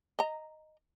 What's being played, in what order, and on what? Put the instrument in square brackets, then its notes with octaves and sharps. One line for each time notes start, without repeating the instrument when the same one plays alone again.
[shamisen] D#5 A#5